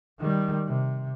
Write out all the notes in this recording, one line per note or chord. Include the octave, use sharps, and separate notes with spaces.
D#3 G3
C3